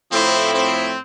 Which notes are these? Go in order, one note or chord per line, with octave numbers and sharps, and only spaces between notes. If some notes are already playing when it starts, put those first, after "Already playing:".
A2 F3 A3 C4 E4
C4